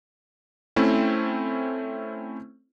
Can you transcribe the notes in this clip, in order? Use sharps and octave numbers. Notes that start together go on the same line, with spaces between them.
A3 C4 C#4 E4